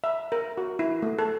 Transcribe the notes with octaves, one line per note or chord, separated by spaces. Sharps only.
E5
A#4
F#4
E4
A3
A4